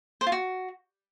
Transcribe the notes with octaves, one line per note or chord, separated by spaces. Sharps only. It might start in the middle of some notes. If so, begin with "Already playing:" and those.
C5
F4
F#4